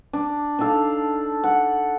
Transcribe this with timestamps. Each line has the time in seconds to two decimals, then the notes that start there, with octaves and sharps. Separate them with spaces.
0.13 D4
0.59 D4 D#4 A4 F5
1.44 F#5